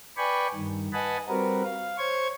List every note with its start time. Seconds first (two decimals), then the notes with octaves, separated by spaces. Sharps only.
0.17 B4 D5 G5 G#5 B5 C#6
0.55 G2 D#3
0.93 B4 D#5 F#5 G#5 A5 B5
1.29 G3 C4 F#4 A#4 B4
1.64 F5
1.98 C5 C#5 C#6 G#6